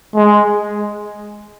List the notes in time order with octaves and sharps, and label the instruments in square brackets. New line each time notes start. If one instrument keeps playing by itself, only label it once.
[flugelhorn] G#3